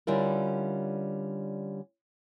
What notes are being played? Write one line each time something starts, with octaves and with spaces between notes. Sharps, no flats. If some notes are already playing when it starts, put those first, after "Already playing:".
D3 G3 C#4 E4 F4 A#4